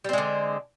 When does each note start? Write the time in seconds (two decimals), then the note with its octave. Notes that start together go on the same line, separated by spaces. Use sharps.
0.04 G3
0.09 C4
0.13 G#3
0.18 D3